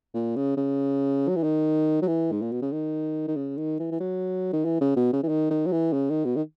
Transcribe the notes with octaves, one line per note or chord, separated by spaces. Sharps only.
A#2
C#3
C#3
F#3
E3
D#3
F#3
E3
G#2
A#2
B2
C#3
D#3
D#3
C#3
D#3
E3
E3
F#3
D#3
E3
C#3
B2
C#3
E3
D#3
D#3
F#3
E3
C#3
D#3
B2
D#3